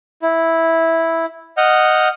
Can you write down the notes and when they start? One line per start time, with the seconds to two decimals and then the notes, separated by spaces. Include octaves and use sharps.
0.22 E4
1.57 D#5 F#5 F6 G6